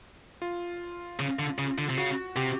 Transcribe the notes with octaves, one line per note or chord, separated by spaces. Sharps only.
F4
C#3
D3
C#3
D3
C3
C#3 F#4
C3 G4